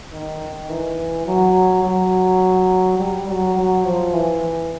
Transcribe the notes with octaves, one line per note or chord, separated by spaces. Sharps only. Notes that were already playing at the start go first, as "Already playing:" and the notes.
D#3
E3
F#3
F#3
G3
F#3
F#3
F3
E3